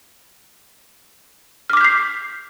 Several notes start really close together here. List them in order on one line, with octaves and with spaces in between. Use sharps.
F6 D6 B6 G6 C7